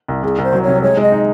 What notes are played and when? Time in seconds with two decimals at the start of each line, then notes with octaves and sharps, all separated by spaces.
0.08 C2
0.23 C2 G#4
0.38 C2
0.43 C5
0.53 F#3
0.63 C3 C#5
0.82 G#3 C#5
0.97 G#3 D#5
1.12 D#4